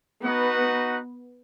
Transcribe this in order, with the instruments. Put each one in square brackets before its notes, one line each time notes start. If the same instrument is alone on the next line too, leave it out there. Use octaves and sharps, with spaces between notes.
[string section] B3 [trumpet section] D#4 F#4 B4 F#5